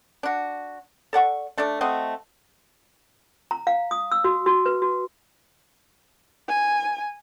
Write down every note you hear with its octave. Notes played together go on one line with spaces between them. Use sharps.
D4 F#4
A4 D5 F#5 C#6
A3 D4 A4 D5
A3 C4 F#4 D#5
A#5
F5
D#6
E6
F#4
F#4
B4
F#4
G#5